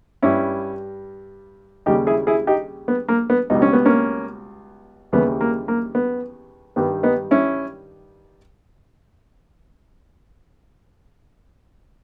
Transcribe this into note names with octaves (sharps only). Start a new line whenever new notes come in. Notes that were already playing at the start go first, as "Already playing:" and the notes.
G2 G3 C#4 E4
D#2 C#3 G3 D#4 G4
E4 G#4
E4 G#4
D#4 G4
B3
A#3
B3
C#2 B2 G3 D#4
C#4
B3
A#3 C#4
D#2 C#3 E3 G3 B3
A#3
A#3
B3
G2 D#3 G3 B3
B3 D#4
C#4 E4